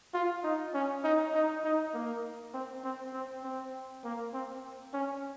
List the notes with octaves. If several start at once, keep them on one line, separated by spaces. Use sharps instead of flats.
F4
D#4
C#4
D#4
D#4
D#4
A#3
C4
C4
C4
C4
A#3
C4
C#4